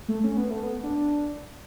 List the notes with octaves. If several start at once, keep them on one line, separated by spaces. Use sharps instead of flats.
A3
C#4
B3
A3
B3
D4